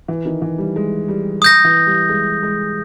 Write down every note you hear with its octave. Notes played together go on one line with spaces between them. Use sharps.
E3
D#3
E3
G3
G#3
G3
D#6 G6 A#6
E3
G3
G#3
G#3